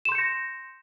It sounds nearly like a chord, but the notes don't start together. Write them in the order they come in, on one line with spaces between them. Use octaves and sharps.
E7 C6 G6 C#7 A#6